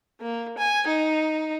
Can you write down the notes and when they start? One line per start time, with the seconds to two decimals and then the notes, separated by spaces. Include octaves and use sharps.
0.21 A#3
0.57 G#5
0.87 D#4